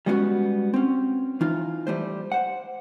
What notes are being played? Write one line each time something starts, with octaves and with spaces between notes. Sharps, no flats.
G3 G#3 B3 C#4 D4 F#4
C4 C#4
E3 D#4 F4
G3 A3 C5
C5 F#5